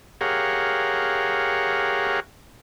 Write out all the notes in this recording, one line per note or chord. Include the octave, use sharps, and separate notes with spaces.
G4 G#4 A#4 C#5 F5 F#5